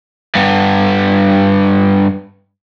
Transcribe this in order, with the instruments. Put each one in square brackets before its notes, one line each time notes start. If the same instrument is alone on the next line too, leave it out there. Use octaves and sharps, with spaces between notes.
[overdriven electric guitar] G2 B3